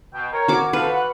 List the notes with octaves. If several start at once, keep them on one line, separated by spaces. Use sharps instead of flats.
B2 G5
A#4 C#5
F#4 D6
F3 A4 B4 F5
F#5